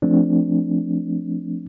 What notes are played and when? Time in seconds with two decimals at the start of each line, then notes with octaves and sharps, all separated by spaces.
0.02 F3 A3 C4 D4